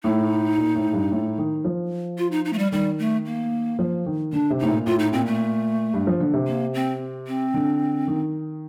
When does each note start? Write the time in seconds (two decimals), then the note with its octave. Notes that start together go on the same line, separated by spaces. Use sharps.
0.04 A2 D#4
0.58 A#2
0.75 A2
0.93 G2
1.11 A2
1.38 D#3
1.64 F3
2.18 F4
2.32 D#4
2.45 D#4
2.53 A3
2.59 G3
2.72 D#3 G3
2.99 A3
3.26 A#3
3.79 F3
4.06 D#3
4.32 D3 D4
4.50 C3
4.59 A2 D#4
4.68 A#2
4.86 A2 F4
4.99 D#4
5.13 A#2 C4
5.26 A3
5.94 G2
6.07 F3
6.20 D3
6.34 C3
6.47 A#3
6.74 C4
7.27 C4
7.54 D3
8.07 D#3